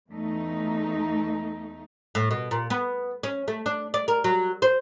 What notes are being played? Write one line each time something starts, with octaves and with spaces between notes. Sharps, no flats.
E2 A3 D#4
A2
B2
A#2
B3
C#4
A3
D4
D5
A#4
F#3
C5